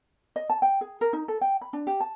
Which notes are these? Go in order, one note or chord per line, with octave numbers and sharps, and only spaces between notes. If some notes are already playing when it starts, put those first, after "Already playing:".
D#5
A5
G5
G#4
A#4
D#4
A4
G5
B5
D4
G4
A5